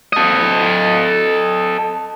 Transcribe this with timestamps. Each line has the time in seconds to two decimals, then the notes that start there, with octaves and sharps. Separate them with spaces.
0.13 A4 D#5